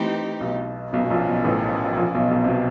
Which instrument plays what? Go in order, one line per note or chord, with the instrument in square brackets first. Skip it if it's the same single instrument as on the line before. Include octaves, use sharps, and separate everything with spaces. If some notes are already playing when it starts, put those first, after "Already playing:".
Already playing: [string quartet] E3 A3 C4 D#4 G4
[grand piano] B1 B2
[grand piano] B1 B2 [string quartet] F3 A#3 C#4
[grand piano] B2
A#1 A#2
B1 B2
A1 A2
A#1 A#2
B1 B2
B1 B2
C3
B2